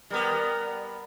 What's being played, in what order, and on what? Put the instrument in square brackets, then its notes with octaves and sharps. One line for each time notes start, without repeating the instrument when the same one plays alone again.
[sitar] G3 B3 [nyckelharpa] A#4